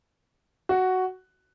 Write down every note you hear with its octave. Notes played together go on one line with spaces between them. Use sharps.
F#4